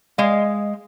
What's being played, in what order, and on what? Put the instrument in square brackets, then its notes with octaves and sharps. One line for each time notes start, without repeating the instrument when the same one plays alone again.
[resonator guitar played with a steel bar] G#3 F5